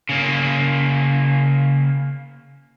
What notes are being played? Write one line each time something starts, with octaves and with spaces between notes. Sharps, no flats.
C#3 A#3